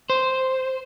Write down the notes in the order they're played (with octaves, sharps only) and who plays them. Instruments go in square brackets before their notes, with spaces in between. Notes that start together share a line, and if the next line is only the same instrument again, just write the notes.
[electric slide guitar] C5